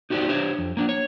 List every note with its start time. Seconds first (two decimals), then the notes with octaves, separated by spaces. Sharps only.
0.10 D#4 F#4 G4 C5 D5
0.28 D4 G4 C5 C#5
0.59 F2
0.77 A#3 D4
0.89 C#5